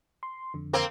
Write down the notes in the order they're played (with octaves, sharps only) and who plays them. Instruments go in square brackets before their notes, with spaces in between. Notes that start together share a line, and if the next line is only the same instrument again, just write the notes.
[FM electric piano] C6
F2 D3
[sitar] A#3 C4